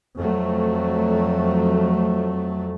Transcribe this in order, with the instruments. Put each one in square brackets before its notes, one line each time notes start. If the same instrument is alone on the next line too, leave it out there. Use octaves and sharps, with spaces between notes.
[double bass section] F2 F#3 A3